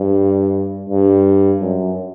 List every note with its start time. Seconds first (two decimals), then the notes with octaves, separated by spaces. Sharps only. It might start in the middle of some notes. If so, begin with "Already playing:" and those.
Already playing: G2
0.90 G2
1.61 F#2